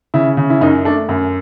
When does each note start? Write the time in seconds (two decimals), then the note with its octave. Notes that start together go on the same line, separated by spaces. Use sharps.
0.14 C#3 E4
0.37 C#3
0.50 E4
0.61 F#2 D#4
0.85 A3 D4
1.09 F#2